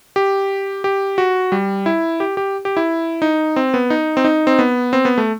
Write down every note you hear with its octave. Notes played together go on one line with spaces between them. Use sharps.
G4
G4
F#4
G3
E4
G4
G4
G4
E4
D#4
C4
B3
D#4
C4
D#4
C4
B3
C4
B3
A3